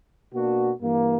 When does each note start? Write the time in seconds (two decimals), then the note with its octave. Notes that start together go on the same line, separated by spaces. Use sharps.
0.32 B2 A#3 D4 F#4
0.81 G2 E3 A#3